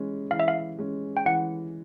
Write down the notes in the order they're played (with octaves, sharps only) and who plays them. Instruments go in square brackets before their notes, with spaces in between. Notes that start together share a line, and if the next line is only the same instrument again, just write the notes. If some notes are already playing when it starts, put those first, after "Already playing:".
Already playing: [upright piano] E3 G#3 C#4
[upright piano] E3 [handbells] F5
[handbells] E5
F5
[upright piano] G#3 C#4
[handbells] G5
[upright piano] E3 [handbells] F#5